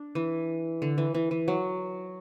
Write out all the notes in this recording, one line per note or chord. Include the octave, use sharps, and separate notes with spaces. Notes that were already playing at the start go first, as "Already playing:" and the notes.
Already playing: D4
E3
D3
E3
E3
E3
F#3